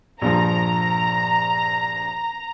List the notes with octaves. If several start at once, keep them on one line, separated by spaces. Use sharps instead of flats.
A#1 G2 F3 A#5